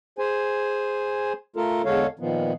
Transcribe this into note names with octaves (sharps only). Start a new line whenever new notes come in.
G#4 C5 G#5
A3 F4 A4 A#4
E2 D3 G#3 A4 C#5 F5
A#2 D#3 F3 B3